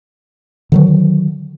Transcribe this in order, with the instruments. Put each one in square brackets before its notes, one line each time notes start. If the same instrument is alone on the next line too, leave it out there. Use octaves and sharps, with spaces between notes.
[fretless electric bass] D3 D#3 F#3